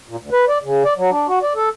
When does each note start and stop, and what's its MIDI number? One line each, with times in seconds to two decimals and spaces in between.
0.08 0.16 46
0.21 0.30 38
0.32 0.45 71
0.48 0.58 74
0.63 0.83 49
0.85 0.94 74
0.97 1.10 54
1.10 1.27 62
1.28 1.39 66
1.43 1.53 74
1.55 1.69 69